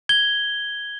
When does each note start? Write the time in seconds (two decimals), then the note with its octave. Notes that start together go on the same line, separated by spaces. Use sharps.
0.09 G#6 G7